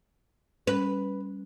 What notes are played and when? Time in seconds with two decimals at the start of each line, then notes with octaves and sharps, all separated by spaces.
0.67 G3 C#4 B4